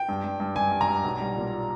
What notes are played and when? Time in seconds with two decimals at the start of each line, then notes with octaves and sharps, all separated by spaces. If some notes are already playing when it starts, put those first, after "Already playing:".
Already playing: G5
0.09 G2
0.24 G2
0.40 G2
0.56 G2 G#5
0.72 G2
0.81 A#5
0.88 G2
1.04 B1
1.21 G3
1.36 A#2